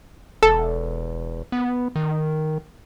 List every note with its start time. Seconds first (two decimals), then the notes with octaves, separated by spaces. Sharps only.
0.43 E1 A4
1.52 B3
1.96 D#3